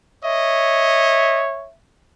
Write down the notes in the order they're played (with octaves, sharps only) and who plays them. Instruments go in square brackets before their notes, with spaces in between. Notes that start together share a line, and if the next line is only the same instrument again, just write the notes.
[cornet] C#5 [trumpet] D#5 [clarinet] E5